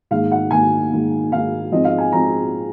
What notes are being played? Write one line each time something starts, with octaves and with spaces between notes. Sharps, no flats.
G#2 D#3 A#3 F5
F#5
G#2 D#3 A#3 G#5
G#2 D#3 A#3
G#2 D#3 A#3 F5
G#2 F3 G#3 C4 D#5
F5
G#5
F3 G#3 C4 A#5